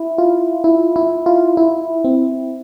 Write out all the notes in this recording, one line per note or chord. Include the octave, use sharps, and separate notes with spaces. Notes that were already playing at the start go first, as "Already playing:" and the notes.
Already playing: E4
F4
E4
E4
F4
E4
C4